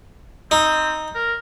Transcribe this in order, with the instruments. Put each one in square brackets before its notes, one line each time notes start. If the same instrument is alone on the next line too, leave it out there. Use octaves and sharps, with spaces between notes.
[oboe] C4 [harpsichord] D#4
[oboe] A#4